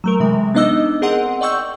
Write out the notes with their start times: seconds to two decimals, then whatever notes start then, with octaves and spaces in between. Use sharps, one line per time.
0.04 F#3 A3 A#4
0.20 C3 E3 G#3
0.54 B3 D4 D#4 D#5 D6 E6
1.02 C4 G#4 A#4 D#5 F#5 C6
1.41 D5 D#5 G5 C#6 E6 G6